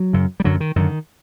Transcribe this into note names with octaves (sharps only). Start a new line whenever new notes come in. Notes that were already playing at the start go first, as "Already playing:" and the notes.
Already playing: F#3
F#2 C#3
G3
F#2 D3 F#3
D#3
F#2 D3 D#3